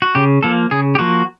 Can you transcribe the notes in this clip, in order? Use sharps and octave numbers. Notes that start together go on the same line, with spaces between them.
F#4
C#3 G4
F3 A#3 A4
C#3 G#4
G4
F3 A#3 F#4